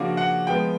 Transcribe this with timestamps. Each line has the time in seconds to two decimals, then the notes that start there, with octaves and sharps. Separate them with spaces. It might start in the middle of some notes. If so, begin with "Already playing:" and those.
Already playing: C#3 F3 A#3 D4 F#4
0.17 F#5
0.47 F3 G#3 B3 G5